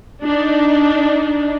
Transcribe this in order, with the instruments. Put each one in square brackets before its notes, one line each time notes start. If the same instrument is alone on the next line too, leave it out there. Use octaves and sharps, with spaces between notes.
[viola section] D4 D#4